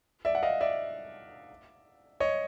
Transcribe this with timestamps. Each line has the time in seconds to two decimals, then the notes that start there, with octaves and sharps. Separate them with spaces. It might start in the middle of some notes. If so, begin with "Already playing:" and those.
0.25 D5 E5
0.35 F#5
0.43 D#5 F5
0.61 D5 E5
2.20 C#5 D#5